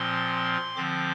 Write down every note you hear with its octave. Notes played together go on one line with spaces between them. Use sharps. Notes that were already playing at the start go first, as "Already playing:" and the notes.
Already playing: A#2 F3 C4 C6
D3 F3 C4 D6